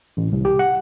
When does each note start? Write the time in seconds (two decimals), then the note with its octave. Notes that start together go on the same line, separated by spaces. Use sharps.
0.17 A1
0.32 C2
0.45 G4
0.59 F#5